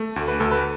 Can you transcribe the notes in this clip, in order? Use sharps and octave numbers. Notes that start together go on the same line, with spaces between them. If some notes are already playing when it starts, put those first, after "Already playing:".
Already playing: A3
D2
B4
D2 A4
B4